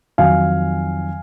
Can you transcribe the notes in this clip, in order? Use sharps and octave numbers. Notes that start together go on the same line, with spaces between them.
F2 D#3 F#3 F5 G#5